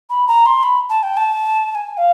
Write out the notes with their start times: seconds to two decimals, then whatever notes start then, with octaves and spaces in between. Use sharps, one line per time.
0.10 B5
0.28 A#5
0.46 C6
0.63 B5
0.90 A5
1.03 G5
1.17 A5
1.71 A5
1.75 G#5
1.97 F5